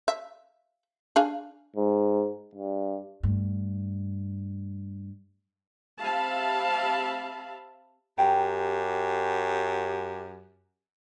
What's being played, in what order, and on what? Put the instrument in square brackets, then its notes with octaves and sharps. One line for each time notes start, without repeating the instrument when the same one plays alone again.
[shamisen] E5
D4 G#4 F5
[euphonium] G#2
G2
[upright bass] G2 A3
[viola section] C4 G4 E5 F5 A5 B5
[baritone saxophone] F#2 [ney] G4 [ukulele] G5 A#5